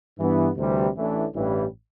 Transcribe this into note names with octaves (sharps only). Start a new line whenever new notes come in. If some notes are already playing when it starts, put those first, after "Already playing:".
G2 E3 B3
D2 C3 E3 G3
A1 A2 E3 A3 D4
A1 G2 E3 G3